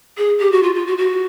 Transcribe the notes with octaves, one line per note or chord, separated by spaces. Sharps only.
G#4
G4
F#4
F4
F4
F#4
F#4